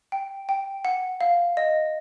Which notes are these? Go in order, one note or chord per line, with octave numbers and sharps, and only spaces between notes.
G5
G5
F#5
F5
D#5